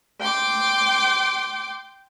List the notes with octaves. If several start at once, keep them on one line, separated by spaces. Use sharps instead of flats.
G5 C6 D6